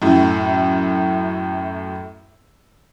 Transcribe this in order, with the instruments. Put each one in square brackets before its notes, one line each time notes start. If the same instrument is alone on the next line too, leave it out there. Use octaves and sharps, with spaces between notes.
[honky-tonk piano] F#2 A2